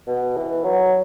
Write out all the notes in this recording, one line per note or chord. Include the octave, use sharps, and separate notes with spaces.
B2
E3
F#3